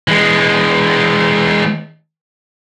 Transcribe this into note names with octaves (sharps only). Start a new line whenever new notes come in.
E3 G#3